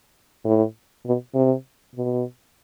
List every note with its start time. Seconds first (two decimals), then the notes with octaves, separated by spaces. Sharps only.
0.45 A2
1.05 B2
1.34 C3
1.95 B2